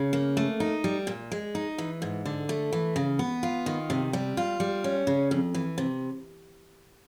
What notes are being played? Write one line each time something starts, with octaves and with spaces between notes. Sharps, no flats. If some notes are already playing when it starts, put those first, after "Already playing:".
Already playing: C#3
A#3
A3
D#4
G3
A#2
G#3
D#4
E3
G#2
D3
A3
E3
C#3
B3
F4
D#3
C3
G3
F4
G3
C#4
C#3
F2
E3
C3